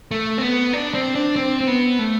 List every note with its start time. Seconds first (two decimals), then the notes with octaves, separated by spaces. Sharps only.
0.11 A3
0.38 C4
0.42 B3
0.73 D4
0.94 C4
1.15 D4
1.36 C4
1.61 C4
1.67 B3
1.99 A3